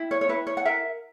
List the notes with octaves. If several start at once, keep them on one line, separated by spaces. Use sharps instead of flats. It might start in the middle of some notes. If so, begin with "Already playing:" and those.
Already playing: E4
C#5
C#5
E4 B4
C#5
F#5
A#4 E5